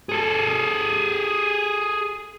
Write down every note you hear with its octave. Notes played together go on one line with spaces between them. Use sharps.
G#4 A4